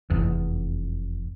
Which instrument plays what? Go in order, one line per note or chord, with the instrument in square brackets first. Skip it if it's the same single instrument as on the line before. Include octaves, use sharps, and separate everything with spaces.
[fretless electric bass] F1 E2